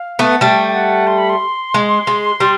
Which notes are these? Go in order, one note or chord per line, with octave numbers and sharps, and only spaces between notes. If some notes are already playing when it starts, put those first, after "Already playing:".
Already playing: F5
A3 B3
F#5
G3 A3 G5
G5
F#5
C6
B5
C6
G#3
G#3
G3